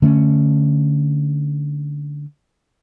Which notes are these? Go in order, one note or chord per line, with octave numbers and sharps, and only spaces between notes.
D3 A3 B3 C#4